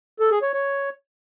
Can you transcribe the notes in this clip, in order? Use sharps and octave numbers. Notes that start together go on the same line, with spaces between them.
A4
G#4
C#5
C#5